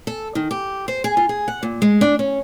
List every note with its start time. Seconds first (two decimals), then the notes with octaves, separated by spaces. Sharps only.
0.07 A4
0.35 D#3
0.51 G4
0.88 C5
1.04 G#4
1.17 F4
1.29 G#4
1.48 F#5
1.63 A#2
1.82 G#3
2.01 D4
2.19 C#4